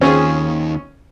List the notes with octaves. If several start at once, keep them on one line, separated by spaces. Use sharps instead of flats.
D#2 D#3 C4 C#4 F4 G#4